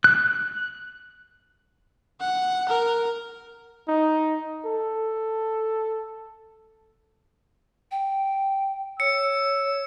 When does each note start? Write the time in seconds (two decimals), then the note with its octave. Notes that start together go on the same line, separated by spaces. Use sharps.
0.04 F#6
2.21 F#5
2.69 A#4
3.88 D#4
4.65 A4
7.91 G5
9.00 C#5 E6 C#7